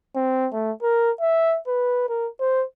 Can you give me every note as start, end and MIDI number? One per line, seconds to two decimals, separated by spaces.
0.16 0.48 60
0.53 0.72 57
0.82 1.11 70
1.21 1.58 76
1.68 2.08 71
2.09 2.28 70
2.40 2.64 72